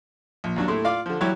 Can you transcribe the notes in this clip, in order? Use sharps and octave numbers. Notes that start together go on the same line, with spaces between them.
A#1
D#2 F#3 D4
A2 A3 E4 C6
F4 D5 F5 D6
D3 F3
E3 F#3 G3 E4 G4 C#5